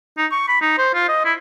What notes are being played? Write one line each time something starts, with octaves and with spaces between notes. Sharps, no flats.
D#4
C#6
B5
D#4
C5
F4
D#5
E4